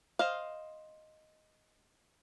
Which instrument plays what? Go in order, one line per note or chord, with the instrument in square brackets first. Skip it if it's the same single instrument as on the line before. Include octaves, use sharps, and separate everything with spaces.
[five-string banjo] C5 D#5 F5